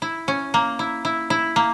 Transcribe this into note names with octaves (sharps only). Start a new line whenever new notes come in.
E4
C#4
A#3
E4
E4
E4
A#3